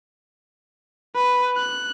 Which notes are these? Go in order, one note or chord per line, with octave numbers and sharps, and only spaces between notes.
B4
F#6